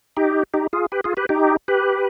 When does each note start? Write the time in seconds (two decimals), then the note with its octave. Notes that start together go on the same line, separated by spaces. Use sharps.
0.17 D#4 G4
0.54 D#4 G4
0.73 F4 G#4
0.92 G4 B4
1.04 F4 G#4
1.17 G4 B4
1.29 D#4 G4
1.68 G4 B4